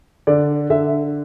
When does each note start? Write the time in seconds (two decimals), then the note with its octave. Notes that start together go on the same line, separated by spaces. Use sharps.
0.27 D3 D5
0.70 D3 E5